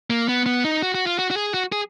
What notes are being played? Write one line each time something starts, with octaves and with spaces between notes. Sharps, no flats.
A#3
B3
B3
D#4
F#4
F#4
F4
F#4
F#4
G#4
F#4
G#4